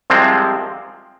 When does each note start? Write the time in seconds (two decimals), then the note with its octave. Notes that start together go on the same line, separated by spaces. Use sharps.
0.10 C2 C3 F3 G#3 C4